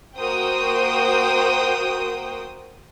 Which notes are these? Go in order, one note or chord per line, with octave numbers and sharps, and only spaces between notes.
A#3 F#4 A#4 C5 G5 D#6